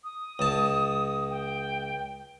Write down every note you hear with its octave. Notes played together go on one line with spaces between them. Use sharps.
D#6
C#2 A5
G5